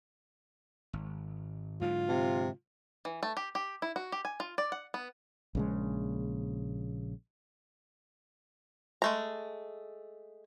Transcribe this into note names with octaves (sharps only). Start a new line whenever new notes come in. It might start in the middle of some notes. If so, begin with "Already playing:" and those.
G#1
G#2 D3 F#3 F4
C3
E3
A3
G4
G4
E4
F#4
G4
G#5
F4
D5
F#5
B3
A#1 C#3 G#3
G#3 A3 A#5